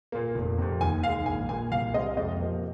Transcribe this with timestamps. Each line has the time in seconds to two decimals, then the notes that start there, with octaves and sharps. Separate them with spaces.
0.12 A#2 A#3
0.35 F1
0.58 F2 C3
0.81 D#2 G#5
1.03 D#3 F5
1.08 G#3
1.26 A#1 G#5
1.49 A#2 A#3 G#5
1.71 C2 F5
1.94 C3 G#3 D#5
2.17 F2 D#5
2.40 C3 F3 A#3